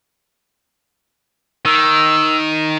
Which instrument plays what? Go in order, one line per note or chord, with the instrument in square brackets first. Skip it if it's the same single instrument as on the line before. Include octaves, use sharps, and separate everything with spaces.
[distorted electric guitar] D#3 [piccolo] E6